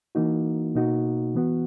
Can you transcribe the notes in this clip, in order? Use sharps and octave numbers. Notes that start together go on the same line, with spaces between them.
E3 A#3 D#4 F#4
B2 A#3 D#4 F#4
E3 B3 F#4